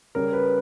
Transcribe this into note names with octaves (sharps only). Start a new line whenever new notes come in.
C#3 G3 C#4 A#4
B4